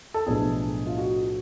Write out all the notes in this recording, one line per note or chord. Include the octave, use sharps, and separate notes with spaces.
A4
B1 A2 F3 B3 D4 G#4
F4
F#4